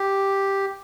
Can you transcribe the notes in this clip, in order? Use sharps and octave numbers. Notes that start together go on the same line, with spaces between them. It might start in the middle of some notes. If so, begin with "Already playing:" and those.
Already playing: G4